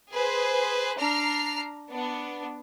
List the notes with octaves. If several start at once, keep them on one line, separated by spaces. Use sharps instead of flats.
G#4 B4 C5
D4 A#5 F6 C7
B3 D4